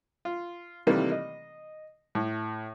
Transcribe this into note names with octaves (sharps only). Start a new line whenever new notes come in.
F4
C3 D#3 E3 G3 A3 A#3
D#5
A2